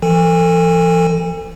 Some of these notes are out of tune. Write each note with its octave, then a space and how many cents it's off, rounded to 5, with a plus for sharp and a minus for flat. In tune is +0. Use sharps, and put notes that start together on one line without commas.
F3 -45 A4 +30 G#5 -40